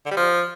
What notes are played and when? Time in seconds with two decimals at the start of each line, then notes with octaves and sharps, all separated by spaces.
0.06 D3
0.11 G3
0.17 F3